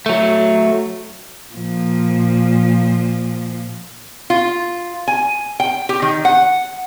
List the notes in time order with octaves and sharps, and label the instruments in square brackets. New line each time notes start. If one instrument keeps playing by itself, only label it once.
[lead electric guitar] F#3 A3
[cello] A#2 F3
[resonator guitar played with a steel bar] F4
G#5
G5
G4
D#3
F#5